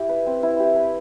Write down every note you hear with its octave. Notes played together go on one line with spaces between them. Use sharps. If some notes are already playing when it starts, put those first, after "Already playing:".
Already playing: E4 G4
B4
C4
E4
G4
B4